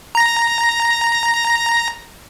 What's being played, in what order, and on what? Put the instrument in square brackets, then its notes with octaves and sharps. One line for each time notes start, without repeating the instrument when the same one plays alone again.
[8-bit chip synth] A#5 A#6